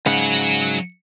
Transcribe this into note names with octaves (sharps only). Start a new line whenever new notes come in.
G#2 C#3 F#3 F#5